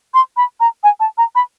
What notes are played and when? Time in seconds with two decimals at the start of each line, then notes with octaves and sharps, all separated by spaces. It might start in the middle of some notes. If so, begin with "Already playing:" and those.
0.14 C6
0.37 B5
0.60 A#5
0.83 G#5
1.00 A5
1.18 A#5
1.35 B5